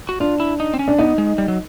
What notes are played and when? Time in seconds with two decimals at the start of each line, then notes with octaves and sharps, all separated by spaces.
0.09 F#4
0.20 D4 F4
0.40 E4
0.60 D#4
0.74 C4
0.79 C#4
0.88 D4
0.98 B3 D#4
1.18 G#3
1.38 G3
1.48 F#3